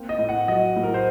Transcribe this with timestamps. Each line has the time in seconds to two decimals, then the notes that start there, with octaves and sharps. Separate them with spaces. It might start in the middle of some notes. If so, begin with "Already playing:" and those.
Already playing: A#3 C4
0.09 D#5
0.19 A2
0.29 F#5
0.48 F#3 D#5
0.76 A2
0.83 A#4
0.94 C5